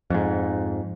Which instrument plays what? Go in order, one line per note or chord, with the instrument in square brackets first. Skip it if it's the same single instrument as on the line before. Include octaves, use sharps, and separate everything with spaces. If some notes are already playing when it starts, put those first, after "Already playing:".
[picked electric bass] F2 G#2